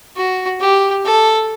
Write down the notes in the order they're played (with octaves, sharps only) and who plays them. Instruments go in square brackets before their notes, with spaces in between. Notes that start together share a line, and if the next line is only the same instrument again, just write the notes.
[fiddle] F#4
G4
A4